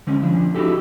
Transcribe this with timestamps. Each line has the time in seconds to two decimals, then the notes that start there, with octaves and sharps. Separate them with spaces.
0.07 D3 G#3 C4 C#4
0.23 F3 D4
0.55 D#4 E4 F#4 G4 A4